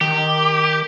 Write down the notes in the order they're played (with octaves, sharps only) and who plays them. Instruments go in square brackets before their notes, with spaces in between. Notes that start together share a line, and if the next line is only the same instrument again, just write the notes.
[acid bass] D#3 [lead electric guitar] G4